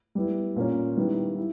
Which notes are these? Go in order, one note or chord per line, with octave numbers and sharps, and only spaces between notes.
G3 B3 E4
A#2 A#3 C#4
D#3 G3 B3 E4
E4